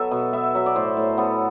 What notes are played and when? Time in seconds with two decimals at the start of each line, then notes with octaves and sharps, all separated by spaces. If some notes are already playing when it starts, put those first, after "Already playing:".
Already playing: F#3 B3 A4 E5
0.11 B2
0.33 B3 E5
0.55 F#3 E5
0.66 D5
0.76 A2 C5
0.97 A2
1.18 B3 A4